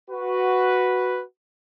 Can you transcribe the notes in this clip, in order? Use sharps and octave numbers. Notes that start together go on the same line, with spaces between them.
F#4 B4